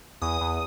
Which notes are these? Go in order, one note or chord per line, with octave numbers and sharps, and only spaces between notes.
E2 D#6
E2